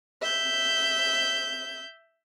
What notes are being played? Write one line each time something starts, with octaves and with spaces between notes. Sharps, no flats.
E5 G6